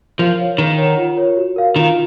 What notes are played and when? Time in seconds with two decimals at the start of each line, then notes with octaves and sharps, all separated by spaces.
0.19 F3 A#4
0.39 C#5 F5
0.58 D#3 G#4
0.78 C#5 F#5
0.98 F4
1.17 A#4 C#5
1.37 F#4
1.56 A#4 F5
1.76 D#3 F4